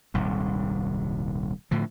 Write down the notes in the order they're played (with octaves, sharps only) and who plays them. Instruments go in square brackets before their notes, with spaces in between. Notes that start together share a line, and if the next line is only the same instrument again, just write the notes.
[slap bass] D#1 C2 G#2
A2 D3 F3